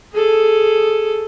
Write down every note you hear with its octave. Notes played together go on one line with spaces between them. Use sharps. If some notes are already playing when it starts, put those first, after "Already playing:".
G#4 A4